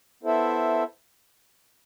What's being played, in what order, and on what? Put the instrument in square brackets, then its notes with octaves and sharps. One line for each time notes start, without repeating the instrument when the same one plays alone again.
[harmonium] B3 E4 A4 C5 E5